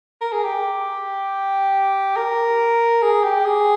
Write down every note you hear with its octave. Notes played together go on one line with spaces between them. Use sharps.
A#4
G#4
G4
A#4
G#4
G4
G#4